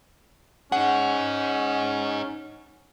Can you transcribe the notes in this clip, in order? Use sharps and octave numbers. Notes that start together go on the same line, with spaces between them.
C#4 D#4 G#4 F#5